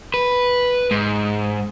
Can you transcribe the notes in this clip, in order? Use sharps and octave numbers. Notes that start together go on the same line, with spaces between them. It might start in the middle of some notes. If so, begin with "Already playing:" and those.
B4
G#2